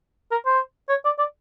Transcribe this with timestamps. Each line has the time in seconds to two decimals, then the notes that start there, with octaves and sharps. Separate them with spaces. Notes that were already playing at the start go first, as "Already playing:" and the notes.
0.31 A#4
0.46 C5
0.89 C#5
1.05 D5
1.19 D5